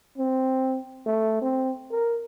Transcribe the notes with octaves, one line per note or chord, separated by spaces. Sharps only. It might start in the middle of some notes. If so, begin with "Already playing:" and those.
C4
A3
C4
A#4